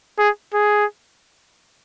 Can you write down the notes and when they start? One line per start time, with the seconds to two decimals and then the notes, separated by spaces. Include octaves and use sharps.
0.19 G#4
0.54 G#4